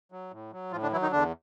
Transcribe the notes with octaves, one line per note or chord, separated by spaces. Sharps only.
F#3
A2
F#3
A2 F3 F4
D3 D4
E3 F#3 E4
D#3 D#4
E2 D3 D4